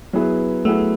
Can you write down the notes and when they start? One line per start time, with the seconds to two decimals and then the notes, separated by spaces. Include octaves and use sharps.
0.13 F#3 B3 E4 G#4 B4
0.65 F#3 A3 B3 E4 G#4 B4